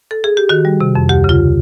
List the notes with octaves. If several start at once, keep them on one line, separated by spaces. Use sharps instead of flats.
A4
G#4
G4
D#3 F#4
G3
C3
F2
D2 G4
C#3 F4